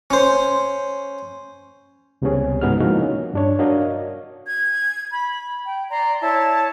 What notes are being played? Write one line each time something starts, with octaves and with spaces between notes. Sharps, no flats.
C#4 C5
C#2 C3 G3 B3 C#4 G#4
G#2 C#3 B3 D#4 F#4 F6
F3 G#3 A#3 D#4 E4 F#4
C#4
G2 D4 C#5
D4 F#4 A#4 C#5 D#5 F5
G#6
B5
G5
D5 A#5 C6
E4 C#5 A5